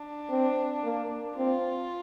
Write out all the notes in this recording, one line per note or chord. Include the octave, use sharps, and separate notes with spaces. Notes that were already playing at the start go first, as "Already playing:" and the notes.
Already playing: D4
C4
A#3
C4 F4